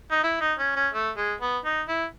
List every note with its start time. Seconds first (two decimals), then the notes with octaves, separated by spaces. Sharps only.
0.11 D#4
0.23 E4
0.41 D#4
0.58 C#4
0.76 C#4
0.93 A3
1.17 G#3
1.41 B3
1.65 D#4
1.88 E4